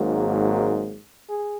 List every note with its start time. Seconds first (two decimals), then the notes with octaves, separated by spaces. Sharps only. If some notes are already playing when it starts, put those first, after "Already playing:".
Already playing: G#1 G#2 F#3 A#3
1.30 G#4